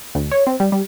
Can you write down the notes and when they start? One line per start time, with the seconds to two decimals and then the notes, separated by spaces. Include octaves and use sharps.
0.15 D2
0.31 C#5
0.47 C4
0.60 G3
0.72 G3